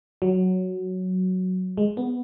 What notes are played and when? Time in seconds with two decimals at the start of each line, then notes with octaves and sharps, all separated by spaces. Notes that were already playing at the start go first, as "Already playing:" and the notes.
0.22 F#3
1.77 G#3
1.97 B3